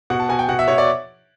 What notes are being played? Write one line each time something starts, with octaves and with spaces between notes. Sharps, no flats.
B2 F#5
A5
B2 G#5
G5
B2 F#5
E5
B2 C#5
D5